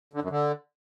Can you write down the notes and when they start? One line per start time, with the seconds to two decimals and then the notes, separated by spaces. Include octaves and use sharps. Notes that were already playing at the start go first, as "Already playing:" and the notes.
0.13 D3
0.22 F#2
0.30 D3